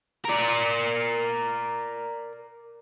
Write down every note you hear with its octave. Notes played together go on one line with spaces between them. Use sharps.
A#4 D5